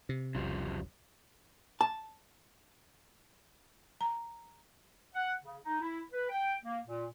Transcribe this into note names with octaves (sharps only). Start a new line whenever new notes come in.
C3
E1 B1 C#3 F3 G3
A5
A#5
F#5
C#3
D#4
E4
B4
G5
A#3
A#2